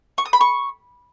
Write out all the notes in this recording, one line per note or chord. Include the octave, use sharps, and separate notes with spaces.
C#6
D#6
B5
C#6